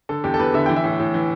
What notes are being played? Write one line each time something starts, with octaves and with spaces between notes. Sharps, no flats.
D3 A4
E2 G4
A4
E2 B4
D3 E5
E3 G5
E5
A2
A2
E3